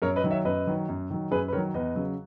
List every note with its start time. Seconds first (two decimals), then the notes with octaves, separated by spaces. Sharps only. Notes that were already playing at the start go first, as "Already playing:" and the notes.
0.02 F#2 A#4 C#5
0.16 B4 D#5
0.24 D#3 F#3
0.31 C#5 E5
0.45 F#2 B4 D#5
0.67 D#3 F#3
0.89 F#2
1.10 D#3 F#3
1.31 F#2 G#4 B4
1.48 B4
1.52 D#3 F#3 A#4 C#5
1.74 E2 B4 D#5
1.95 C#3 F#3